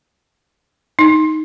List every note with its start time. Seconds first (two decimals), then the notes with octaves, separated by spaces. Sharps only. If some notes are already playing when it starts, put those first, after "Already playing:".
0.99 D#4